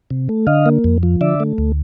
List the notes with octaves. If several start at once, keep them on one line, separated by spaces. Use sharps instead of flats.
C3
A3
D3 D#5 F5
A#3
F2
F3
D3 D5 E5
A3
D2